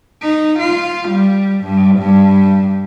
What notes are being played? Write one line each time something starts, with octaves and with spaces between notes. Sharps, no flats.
D#4
F4
G3
G2
G2